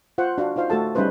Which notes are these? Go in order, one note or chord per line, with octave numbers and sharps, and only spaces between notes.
F4 C5 F#5
D4 F#4 F5
D#4 F4 C5 F5
A3 F#4 A4 A5
G3 C#4 D#4 B4 C5